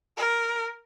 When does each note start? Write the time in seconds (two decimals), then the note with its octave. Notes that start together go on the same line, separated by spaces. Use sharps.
0.17 A#4